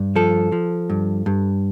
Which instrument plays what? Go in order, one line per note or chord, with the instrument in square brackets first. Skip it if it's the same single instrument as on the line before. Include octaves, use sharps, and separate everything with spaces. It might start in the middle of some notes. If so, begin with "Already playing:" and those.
Already playing: [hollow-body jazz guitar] G2
F3 A4
F3
G2
G2